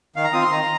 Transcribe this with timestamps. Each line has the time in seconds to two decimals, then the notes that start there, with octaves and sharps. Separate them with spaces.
0.16 D#3 F5
0.24 A#5
0.33 C4 F4 D#6
0.42 C6
0.51 D#3 A#5